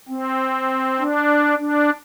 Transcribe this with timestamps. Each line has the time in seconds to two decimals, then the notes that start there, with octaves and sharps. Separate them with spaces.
0.09 C4
0.99 D4
1.58 D4